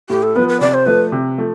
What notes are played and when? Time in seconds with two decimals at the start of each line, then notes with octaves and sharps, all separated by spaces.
0.09 A2 G4
0.23 A4
0.36 F3 B3 B4
0.49 B4
0.61 C3 D5
0.74 C5
0.86 F3 A3 B4
1.12 C3
1.38 F3 A3